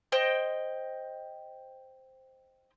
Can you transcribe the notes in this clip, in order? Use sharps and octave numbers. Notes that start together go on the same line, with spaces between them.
C5 D#5 G5